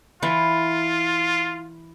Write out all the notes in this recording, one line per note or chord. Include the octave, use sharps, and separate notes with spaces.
E3 E4 F4